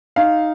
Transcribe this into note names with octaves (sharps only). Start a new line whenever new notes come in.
D#4 F5